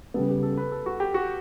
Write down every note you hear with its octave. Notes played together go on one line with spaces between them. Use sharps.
C#3 G3 B3 A4
G4
A4
B4
A4
F#4
G4
F#4